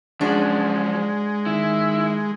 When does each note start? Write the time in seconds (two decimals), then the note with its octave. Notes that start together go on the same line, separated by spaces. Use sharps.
0.21 C#3 F3 F#3 G#3 D4 F#4
1.46 D#3 E4